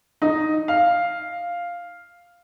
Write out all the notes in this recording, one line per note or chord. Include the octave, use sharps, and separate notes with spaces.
D#4
F5